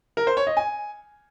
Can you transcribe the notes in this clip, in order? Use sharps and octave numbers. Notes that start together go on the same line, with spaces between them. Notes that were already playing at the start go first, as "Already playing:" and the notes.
A#4
C5
C#5
D#5
G#5